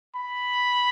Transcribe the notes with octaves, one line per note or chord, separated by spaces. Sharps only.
B5